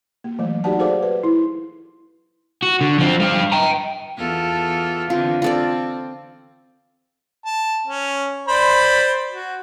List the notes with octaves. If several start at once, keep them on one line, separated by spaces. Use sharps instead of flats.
A#3
E3 F#3 A3
D#4 F#4 G4 D5 F#5 A5
G#4 A4 C5 D5 F5 D6
B4
E4
F#4
D3
F3 C4
G2 F5
G5 A#5
E2 F4 A4
D3 E3 C4 F4
C4 F4 A4 D5
A5
C#4
C5 D5 B5
F#4